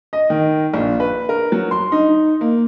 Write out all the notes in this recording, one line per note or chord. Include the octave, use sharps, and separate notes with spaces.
D#5
D#3
A#1
B4
A#4
F#3
C6
D#4
A#3